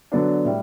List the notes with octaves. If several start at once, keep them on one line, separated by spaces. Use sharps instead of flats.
D3 F#3 B3 D4
A2 G3